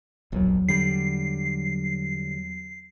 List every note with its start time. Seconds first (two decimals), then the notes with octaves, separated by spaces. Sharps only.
0.32 D1 A#1 E2 F#3
0.68 D3 G3 C7